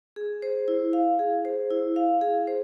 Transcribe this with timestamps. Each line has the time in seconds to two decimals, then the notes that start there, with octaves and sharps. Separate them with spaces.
0.16 G#4
0.42 C5
0.68 E4
0.93 F5
1.19 G#4
1.45 C5
1.71 E4
1.96 F5
2.21 G#4
2.47 C5